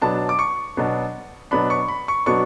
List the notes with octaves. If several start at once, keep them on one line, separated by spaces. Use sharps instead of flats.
B2 F#3 B3 D4 A5
D6
C#6
B2 F#3 B3 D4
B2 F#3 B3 D4 B5
C#6
B5
C#6
B2 F#3 B3 D4 C#6